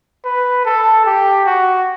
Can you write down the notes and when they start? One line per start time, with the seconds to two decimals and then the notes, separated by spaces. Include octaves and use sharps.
0.25 B4
0.65 A4
1.06 G4
1.46 F#4